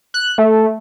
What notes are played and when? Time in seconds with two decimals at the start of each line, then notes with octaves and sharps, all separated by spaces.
0.14 F#6
0.38 A3